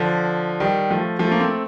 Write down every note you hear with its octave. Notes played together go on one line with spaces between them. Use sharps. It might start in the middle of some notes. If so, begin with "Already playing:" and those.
Already playing: D3 F3
D#3 G3
F3 A3
F3 A3
A#3
A3 C4